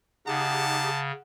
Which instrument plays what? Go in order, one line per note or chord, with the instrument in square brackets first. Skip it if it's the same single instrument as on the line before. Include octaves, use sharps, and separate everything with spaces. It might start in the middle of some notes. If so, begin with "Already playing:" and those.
[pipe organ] C#3 [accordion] D#4 G4 G#4 [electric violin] F#5 [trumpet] A5